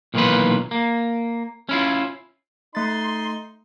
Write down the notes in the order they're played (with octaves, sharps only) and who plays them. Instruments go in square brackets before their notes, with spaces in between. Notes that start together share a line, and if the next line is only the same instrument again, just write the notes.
[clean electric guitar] B1 A#2 D#3 E3 F4 B4
A#3
C#4 E4 F4
[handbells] A3 A6 [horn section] D#4 C6